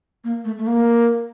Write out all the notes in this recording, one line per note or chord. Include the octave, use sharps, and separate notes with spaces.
A#3
A3
A3
A#3